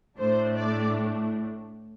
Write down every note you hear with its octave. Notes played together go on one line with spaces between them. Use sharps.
A2 A3 D4 C5
D5